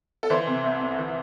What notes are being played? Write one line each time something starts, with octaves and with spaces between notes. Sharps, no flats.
A4
E3 C5
C3
C2
C2
E3